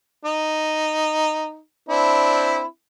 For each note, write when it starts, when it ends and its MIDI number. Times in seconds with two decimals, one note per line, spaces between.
0.25 1.58 63
1.89 2.63 60
1.89 2.63 62
1.89 2.63 64